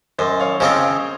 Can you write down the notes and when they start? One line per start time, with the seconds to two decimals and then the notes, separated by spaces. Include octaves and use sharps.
0.19 F#2 C5 D#5
0.40 C#5 F5
0.60 C#3 F3 C4 C5 D#5